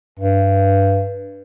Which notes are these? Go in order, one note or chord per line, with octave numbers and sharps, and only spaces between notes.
G2